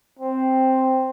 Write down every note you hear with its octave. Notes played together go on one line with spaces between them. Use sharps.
C4